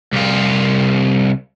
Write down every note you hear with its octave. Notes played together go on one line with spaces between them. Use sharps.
C2 F4